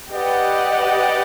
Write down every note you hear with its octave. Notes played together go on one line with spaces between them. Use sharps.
G4 B4 D5 D#5 F#5